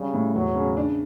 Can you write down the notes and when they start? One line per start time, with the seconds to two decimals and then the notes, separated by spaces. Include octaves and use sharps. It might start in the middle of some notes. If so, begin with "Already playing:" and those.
Already playing: C#3 G3
0.13 A2
0.35 E1 F#3
0.56 C#3
0.77 D4